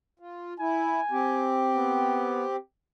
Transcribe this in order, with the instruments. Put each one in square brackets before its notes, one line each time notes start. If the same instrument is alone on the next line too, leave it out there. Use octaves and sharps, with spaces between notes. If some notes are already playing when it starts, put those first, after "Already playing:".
[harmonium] F4
[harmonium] E4 [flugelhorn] G#5
[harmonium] C4 G4
[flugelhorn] B3